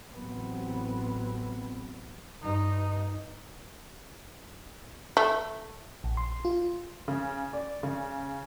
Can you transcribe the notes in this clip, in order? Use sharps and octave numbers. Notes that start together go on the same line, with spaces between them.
A1 F#3 B3 C4
G2 D#4
A3
A#1
C6
F4
C#3
D5
C#3